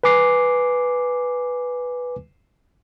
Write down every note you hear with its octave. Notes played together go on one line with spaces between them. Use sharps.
B4 G#5 D6 C7